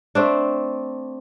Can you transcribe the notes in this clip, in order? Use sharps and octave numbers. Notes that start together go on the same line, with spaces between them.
A3 C4 D4